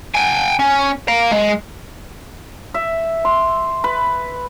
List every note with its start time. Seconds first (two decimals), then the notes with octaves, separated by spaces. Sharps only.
0.15 G5 G#5
0.59 C#4
1.08 F5 A#5
1.31 G#3
2.74 E5
3.25 C6
3.84 B4